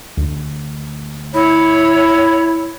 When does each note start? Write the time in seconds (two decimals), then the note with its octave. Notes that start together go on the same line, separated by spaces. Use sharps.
0.17 D2
1.34 E4 C#5 B5